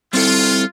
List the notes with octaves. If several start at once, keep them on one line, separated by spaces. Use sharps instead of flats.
G3 C4 E4 F4 A4